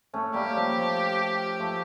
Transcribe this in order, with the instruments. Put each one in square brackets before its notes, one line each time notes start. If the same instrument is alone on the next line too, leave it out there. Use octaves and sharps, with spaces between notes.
[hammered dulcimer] A3 C#4
[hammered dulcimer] G3 A#3 [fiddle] G4
[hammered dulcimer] F3 A3
F3
F3 A3